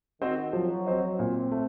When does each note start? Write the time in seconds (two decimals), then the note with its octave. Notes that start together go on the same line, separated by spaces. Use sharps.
0.21 D#3 C4 F#4 C5 D#5
0.53 F3 F#3
0.86 C4 F#4 C5 D#5
1.19 A#2 C4
1.51 A3